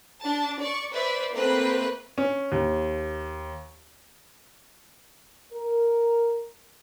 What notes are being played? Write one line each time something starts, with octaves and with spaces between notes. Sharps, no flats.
D4 A5
D5 C#6
B4 C5 D5 E5
A3 A#3 C4 B4 C5
C#4
D#2
A#4